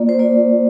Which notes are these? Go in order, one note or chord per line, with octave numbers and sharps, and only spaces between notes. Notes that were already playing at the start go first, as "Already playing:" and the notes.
Already playing: A#3 F4 D5
C5
A#3 F4 D5